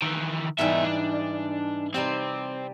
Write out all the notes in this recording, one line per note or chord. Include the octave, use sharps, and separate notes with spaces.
D#3 E3
G#2 B2 E3 G3 E5
D4
C3 G3 C4 G4